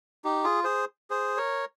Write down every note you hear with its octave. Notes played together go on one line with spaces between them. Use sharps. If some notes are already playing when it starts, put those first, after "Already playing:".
D#4 G4
F4 G#4
G#4 C5
G#4 C5
A#4 C#5